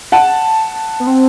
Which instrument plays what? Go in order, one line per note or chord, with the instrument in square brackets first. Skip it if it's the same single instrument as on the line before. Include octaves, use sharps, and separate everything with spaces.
[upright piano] F#5 A5
[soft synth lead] B3
C4